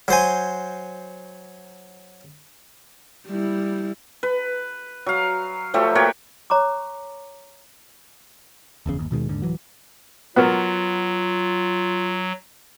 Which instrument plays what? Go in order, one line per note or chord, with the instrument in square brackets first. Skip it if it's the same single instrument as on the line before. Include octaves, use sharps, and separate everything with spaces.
[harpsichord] F#3 C5 G#5
[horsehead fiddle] G3 E4
[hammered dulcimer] B4
F#3 F5
F3 F#3 A3 G4
A#3 F#4 G4 C#5
[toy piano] C#5 A#5 C#6 D6
[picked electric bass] F1 E2 C#3
G1 D#2
D#2 B2 D#3 G#3
D#2 G#2 D3
D1 E3 F#3
[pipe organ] F#3 [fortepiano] B3 F#4 A#4 [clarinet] F4